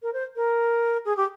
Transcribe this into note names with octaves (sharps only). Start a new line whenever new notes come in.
A#4
C5
A#4
G#4
G4